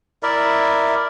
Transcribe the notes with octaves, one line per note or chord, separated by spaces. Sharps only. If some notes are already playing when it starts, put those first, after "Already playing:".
E4 A#4 D5 E5